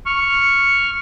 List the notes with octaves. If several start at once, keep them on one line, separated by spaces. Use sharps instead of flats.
C#6 F6